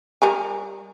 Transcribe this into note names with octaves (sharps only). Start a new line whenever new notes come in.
G3 A#4 G#5